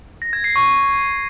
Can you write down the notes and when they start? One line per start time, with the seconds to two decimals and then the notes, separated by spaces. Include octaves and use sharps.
0.22 A#6
0.33 G#6
0.44 C7
0.56 C#6